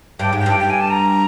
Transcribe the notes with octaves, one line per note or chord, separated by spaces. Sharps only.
G2 G5
G#2
G5
G2
G5
G#5
A5
A#5